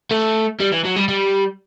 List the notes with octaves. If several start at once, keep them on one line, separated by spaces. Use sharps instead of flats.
A3
G3
E3
F#3
G3
G3